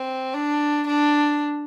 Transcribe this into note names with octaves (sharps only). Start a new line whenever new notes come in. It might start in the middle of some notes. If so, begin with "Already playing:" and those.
Already playing: C4
D4
D4